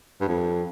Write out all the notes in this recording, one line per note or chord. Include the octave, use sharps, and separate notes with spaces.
G2
F2